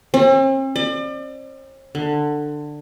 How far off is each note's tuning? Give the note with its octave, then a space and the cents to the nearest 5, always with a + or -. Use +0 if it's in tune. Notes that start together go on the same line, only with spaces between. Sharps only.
C4 +45
D5 +35
D3 +15